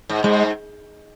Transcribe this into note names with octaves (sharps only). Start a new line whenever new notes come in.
G#2
G#2 G#3